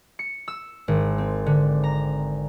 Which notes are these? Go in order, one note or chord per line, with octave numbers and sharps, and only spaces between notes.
C#7
E6
G#1
C4
D3
A#5